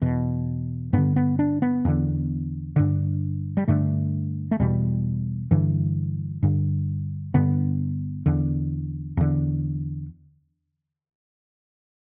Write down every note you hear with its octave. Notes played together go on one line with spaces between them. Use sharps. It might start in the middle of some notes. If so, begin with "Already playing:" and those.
E2 B2
G2 D3 B3
B3
D4
B3
E2 D3
G2 D3
G3
G2 D3 A3
A3
E2 B2 G3
G2 D3 E3
G2 D3
G2 D3 B3
E2 D3
E2 D3